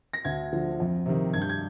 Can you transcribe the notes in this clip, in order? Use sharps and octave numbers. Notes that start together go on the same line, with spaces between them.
A#6
D2 G#6
D3 F3
F2
C3 D#3
G2 G#6
G6
G#6